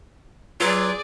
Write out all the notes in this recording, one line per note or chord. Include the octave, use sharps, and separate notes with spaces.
F#3 F4 G#4 B4 D5 G#6